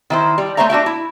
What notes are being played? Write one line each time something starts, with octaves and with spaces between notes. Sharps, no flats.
D#3 E4 C5
G3
A3 C4 C5 C#5 E5 A#5
D4 F#4 G4 E5
E4